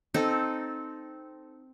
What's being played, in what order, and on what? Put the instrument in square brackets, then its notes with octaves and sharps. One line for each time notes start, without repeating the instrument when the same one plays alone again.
[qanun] C4 D#4 A4